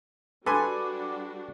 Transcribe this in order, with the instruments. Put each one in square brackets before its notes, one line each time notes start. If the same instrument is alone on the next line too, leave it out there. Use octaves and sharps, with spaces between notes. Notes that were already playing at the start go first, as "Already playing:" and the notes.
[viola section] G3 D4 F#4 [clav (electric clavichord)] A4 B4 [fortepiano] G#5 C6 [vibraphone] D6